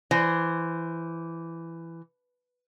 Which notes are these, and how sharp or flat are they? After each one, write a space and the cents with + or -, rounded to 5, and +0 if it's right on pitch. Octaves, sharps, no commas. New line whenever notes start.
E3 +10 C5 +0